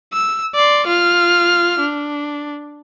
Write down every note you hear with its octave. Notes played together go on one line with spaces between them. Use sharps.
E6
D5 C6
F4 F6
D4